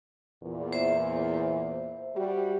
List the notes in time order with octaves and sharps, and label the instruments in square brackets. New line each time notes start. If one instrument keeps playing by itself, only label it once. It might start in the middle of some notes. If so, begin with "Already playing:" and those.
[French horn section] E2 A#2
[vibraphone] C5 E5
[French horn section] G3 F#4 G4